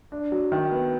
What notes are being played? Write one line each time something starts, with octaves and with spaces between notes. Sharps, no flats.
D4
F#3
D#3
B3